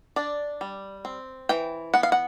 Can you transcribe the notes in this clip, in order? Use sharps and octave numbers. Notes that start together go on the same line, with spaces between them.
D4 D5
G3
C4
E3 G5
B3 F#5
F5
F#5